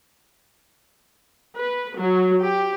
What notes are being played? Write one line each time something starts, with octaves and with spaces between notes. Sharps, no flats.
B4
F#3
G4